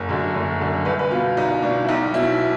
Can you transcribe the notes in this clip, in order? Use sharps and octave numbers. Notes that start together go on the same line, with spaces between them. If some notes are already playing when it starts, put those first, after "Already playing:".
Already playing: F#1 A#4
F#2 D3
F#1
F#2 D3
C2 B4
B4
B2 F4
C2 D#4
B2 D4
E4
B1 D#4
B2 E4